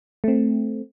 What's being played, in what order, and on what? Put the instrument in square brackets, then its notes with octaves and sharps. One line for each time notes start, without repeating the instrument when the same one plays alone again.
[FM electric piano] A3 C4